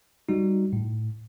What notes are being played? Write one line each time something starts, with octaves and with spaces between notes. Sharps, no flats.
G3 D#4 F#4
A2